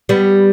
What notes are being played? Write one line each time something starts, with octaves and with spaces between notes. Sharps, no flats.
G3 B3